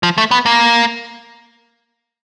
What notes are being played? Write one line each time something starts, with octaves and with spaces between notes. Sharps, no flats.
F3
A3
B3
A#3